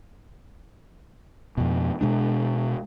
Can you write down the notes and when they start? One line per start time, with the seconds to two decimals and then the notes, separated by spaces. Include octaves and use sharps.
1.57 F2 B2
2.01 B2 G#3 D4